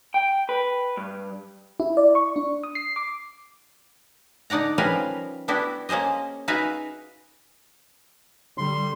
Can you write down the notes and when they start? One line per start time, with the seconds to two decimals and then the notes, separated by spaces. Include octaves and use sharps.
0.14 G5
0.49 B4
0.97 G2
1.80 E4
1.97 D5
2.15 C#6
2.36 D4
2.63 D#6
2.75 C7
2.96 D6
4.50 D3 D#4 D5 F#5 A#5
4.78 F3 G3 C#4 A#4 B4 F5
5.48 B3 D4 E4 F#4 G4
5.89 A#3 C#4 G#4 C5 D#5
6.48 D#4 F#4 G#4 B4 E5 F5
8.58 D3 G3 C6